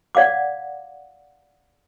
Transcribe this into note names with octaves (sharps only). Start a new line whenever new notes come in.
D5 F5 F#5 D6